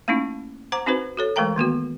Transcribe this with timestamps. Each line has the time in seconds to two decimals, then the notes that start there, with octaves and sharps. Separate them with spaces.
0.08 A3 A#3 C#4 D#4 E4
0.72 C5 F#5 A#5 D6
0.86 C4 D#4 F#4 B4 C5
1.17 F#4 A4 C#5
1.36 E3 G#3 A3 A#4 G5 A#5
1.56 D#3 A#3 B3 F#4